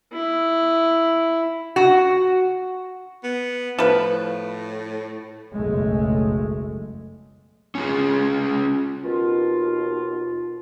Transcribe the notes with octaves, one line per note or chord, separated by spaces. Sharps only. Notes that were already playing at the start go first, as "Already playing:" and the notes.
E4
F#4
B3
A2 F3 B4
F#1 B1 G#3 A3
C#4 F4 G#4
D#2 B2 F4